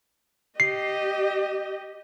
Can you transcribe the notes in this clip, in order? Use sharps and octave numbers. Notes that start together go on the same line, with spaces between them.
G4 D#5 C7